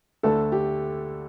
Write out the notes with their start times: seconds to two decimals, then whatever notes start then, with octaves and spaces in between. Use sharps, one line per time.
0.23 D2 D3 A3 A4
0.52 G4